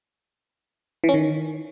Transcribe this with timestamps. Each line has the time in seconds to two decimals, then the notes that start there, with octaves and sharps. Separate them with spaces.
1.04 E3
1.09 C#4
1.14 D#3